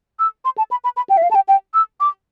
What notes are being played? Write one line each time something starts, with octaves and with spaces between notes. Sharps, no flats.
E6
C6
A5
B5
B5
B5
G5
E5
F5
A5
G5
G5
E6
D6